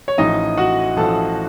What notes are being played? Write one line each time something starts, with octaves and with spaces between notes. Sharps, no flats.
C#5
A1 A2 F3 D#4 D#5
F#4 F#5
A1 A2 F3 A4 A5